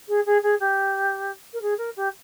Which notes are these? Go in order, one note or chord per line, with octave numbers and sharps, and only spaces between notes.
G#4
G#4
G#4
G4
A#4
G#4
A#4
G4